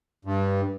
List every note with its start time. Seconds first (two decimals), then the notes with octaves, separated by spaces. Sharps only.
0.25 G2